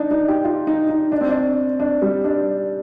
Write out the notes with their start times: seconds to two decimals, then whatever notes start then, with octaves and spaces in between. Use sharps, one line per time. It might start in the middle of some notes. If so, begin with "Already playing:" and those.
Already playing: D4 D#4
0.11 D#4
0.28 G4
0.44 F4
0.67 D#4
0.89 D#4
1.12 D4
1.21 C4
1.29 D4
1.80 D4
2.02 G3
2.24 D4